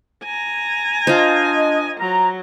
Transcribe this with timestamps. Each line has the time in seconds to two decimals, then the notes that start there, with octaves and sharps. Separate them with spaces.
0.24 G#5 A#5
1.07 D4 F4 C5 D#5
2.00 F#3 A#5